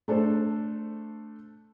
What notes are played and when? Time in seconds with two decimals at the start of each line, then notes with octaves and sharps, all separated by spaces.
0.08 A3 D4 A4 C5